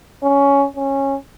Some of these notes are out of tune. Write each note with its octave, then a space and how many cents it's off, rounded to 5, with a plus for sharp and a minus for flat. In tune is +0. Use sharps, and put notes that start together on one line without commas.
C#4 +10
C#4 -15